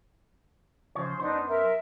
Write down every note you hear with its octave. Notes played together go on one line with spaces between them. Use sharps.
C#3 F3 C5 C#5
F#2 B3 D4 D#4 C5
A#4 E5